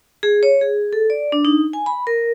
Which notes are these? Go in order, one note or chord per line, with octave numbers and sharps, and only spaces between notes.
G#4
C#5
G#4
A4
D5
D4
D#4
G#5
B5
A#4